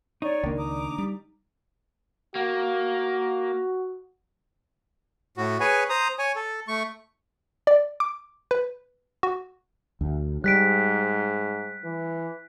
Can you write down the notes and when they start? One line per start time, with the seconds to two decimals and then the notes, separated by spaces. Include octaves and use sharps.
0.22 D#4 C#5 D5 C#6
0.44 C#2 D#3 A#3 D4
0.58 A#5 D6 D#6
0.98 G3
2.35 A#3 F#4
5.37 A2 F#4
5.60 G#4 B4 C#5 G#5
5.90 C5 A#5 D#6
6.19 C#5 G#5
6.36 A4
6.68 A3 C#6
7.67 D5
8.00 D6
8.51 B4
9.23 F#4
10.01 D2
10.44 G#2 G3 F#6 B6 D7
11.84 E3